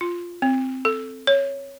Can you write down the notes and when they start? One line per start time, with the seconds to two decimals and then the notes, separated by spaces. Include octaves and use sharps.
0.01 F4
0.42 C4
0.85 A4
1.27 C#5